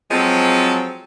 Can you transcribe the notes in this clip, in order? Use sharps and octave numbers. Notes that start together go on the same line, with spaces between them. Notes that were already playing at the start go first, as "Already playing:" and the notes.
F3 F#3 G#3 C4 A4